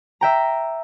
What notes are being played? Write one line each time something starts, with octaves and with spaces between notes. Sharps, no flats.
E5 G5 A#5